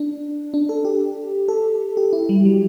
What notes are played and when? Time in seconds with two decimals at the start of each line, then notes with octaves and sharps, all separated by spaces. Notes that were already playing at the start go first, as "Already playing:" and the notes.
Already playing: D4
0.54 D4
0.69 A4
0.85 G4
1.48 A4
1.97 G4
2.13 E4
2.29 G3
2.45 F#3